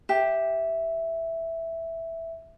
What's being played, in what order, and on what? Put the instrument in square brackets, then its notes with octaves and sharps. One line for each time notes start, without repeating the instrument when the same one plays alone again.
[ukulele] G4 [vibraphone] E5